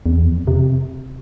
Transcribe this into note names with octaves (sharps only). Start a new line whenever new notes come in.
E2
F2
C3